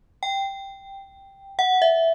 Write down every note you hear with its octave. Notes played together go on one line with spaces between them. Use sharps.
G5
F#5
E5